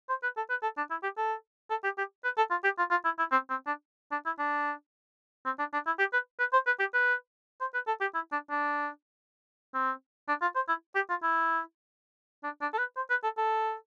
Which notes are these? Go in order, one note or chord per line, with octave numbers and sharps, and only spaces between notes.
C5
B4
A4
B4
A4
D4
E4
G4
A4
A4
G4
G4
B4
A4
F4
G4
F4
F4
E4
E4
C4
C4
D4
D4
E4
D4
C4
D4
D4
E4
G4
B4
B4
C5
B4
G4
B4
C5
B4
A4
G4
E4
D4
D4
C4
D4
F4
C5
E4
G4
F4
E4
D4
D4
A4
B4
C5
B4
A4
A4